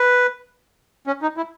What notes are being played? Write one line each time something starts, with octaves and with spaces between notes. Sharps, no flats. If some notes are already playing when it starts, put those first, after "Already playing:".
Already playing: B4
C#4
D#4
E4